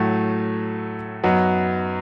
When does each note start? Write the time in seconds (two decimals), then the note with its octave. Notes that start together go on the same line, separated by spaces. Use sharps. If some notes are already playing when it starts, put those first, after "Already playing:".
Already playing: A2 F#3 A3
1.24 F#2 F#3 B3 D#4